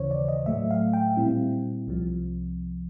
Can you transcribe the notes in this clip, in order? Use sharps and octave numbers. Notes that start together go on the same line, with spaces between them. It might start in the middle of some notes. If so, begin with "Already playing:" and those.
Already playing: D#2 C#3 E3 C5 C#5
D5
D#5
A2 F#3 A3 E5
F5
G5
A#2 G3 C4 E4
C2 C3 F3